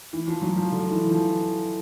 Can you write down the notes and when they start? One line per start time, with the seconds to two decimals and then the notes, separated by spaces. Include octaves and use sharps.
0.13 E3
0.28 F3
0.42 F#3
0.56 F3
0.72 D3
0.91 E3
1.11 F3